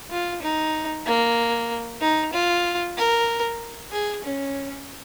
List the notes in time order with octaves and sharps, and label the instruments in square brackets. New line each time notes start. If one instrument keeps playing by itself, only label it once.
[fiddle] F4
D#4
A#3
D#4
F4
A#4
G#4
C#4